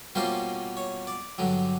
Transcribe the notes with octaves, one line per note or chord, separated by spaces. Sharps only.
B2 G3 A#3 C#4 F4 C5
C#5
D5
G2 D3 F#3